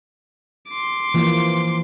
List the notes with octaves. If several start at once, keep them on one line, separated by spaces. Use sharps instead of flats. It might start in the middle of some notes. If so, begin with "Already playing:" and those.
C6 D6
E3 F3 A#3